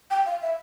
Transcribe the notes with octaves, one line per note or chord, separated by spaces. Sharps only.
G5
F5
E5